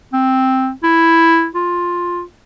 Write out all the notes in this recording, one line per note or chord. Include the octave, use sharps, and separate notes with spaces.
C4
E4
F4